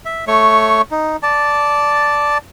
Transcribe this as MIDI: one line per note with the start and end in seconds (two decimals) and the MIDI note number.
0.05 0.25 76
0.27 0.82 57
0.27 0.82 73
0.27 0.82 85
0.91 1.17 63
1.23 2.38 74
1.23 2.38 81